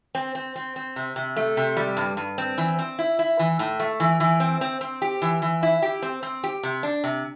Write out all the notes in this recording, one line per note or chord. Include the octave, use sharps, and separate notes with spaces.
C4
C4
C4
C4
C3
C3
A3
C3
G3
G2
G2
C4
E3
C4
E4
E4
E3
A2
A3
E3
E3
C4
C4
C4
G4
E3
E3
E4
G4
C4
C4
G4
C3
D4
C3